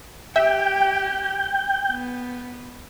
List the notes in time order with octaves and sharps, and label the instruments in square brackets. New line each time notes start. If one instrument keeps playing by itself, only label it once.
[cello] G4 [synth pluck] E5 [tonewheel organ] G5
[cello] B3